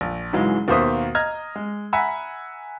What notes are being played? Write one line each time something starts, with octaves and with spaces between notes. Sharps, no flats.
A#1
G#2 C#3 E3 F#3 G#3
D#2 B2 A#3 C5 E5 D#6
D#5 A#5 F6 G#6
G#3
E5 F#5 G#5 A#5 B5 E6